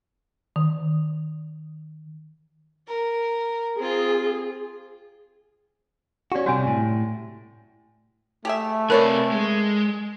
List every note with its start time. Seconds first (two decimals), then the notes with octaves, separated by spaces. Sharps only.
0.56 D#3
2.88 A#4
3.78 C4 F4 G#4
6.32 C#4 F#4 G4 D5
6.46 C3 G3 F#4 C#5 G#5
6.67 A2
8.45 A3 G4 G#4 E5
8.90 C3 A#4 B4 C#5 D5 G#5
9.31 G#3